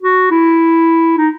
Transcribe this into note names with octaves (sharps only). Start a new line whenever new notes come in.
F#4
E4
D#4